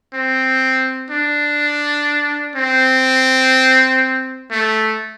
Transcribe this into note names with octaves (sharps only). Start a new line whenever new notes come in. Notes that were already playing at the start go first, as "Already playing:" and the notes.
C4
D4
C4
A3